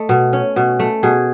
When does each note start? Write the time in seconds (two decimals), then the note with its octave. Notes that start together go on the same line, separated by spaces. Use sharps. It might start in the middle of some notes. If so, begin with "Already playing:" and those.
Already playing: A3 D#5
0.09 B2
0.33 C#4
0.56 B2
0.79 A3
1.03 B2 G#4